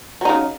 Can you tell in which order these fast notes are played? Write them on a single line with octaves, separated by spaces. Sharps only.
F#3 D#4 C#3